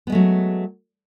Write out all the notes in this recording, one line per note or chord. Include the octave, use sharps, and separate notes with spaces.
F#3 G#3 A3 B3